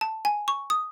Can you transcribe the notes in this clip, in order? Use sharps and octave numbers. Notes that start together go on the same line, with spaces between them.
A5
G#5
C#6
D#6